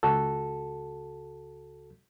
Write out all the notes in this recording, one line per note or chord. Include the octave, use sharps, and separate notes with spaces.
C#2 F#4 A4